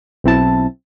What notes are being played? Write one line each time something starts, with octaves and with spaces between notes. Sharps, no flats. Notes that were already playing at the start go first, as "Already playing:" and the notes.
B1 C4 E4 A5